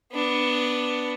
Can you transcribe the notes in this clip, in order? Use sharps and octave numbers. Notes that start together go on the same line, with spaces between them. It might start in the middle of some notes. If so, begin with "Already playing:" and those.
B3 D4